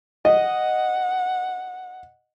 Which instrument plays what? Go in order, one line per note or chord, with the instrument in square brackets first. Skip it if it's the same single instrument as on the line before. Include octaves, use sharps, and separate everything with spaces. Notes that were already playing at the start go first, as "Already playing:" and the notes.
[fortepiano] D#5 [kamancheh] F#5